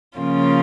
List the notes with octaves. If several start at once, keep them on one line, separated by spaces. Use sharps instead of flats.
C#3 F3 A#3 C#4 F4